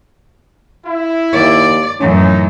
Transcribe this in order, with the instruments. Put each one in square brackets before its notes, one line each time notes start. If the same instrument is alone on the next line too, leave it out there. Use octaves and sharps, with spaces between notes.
[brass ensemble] E4
[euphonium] D#2 [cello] D5
[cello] F#2 A2 [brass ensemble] E3 D#4 [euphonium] C#4